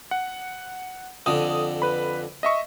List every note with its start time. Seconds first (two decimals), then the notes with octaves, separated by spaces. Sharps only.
0.11 F#5
1.26 F2 D3 D#6
1.82 B4 B5
2.43 D#5 E5 C#6